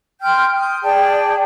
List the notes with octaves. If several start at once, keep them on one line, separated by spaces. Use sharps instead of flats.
G5 C6 F6 G6
D#6
G#4 D5 G5 A5